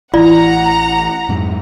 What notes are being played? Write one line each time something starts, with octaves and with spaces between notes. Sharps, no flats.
A1 E3 E4 F4 D5 F#5 A#5
F2 G#2 F#3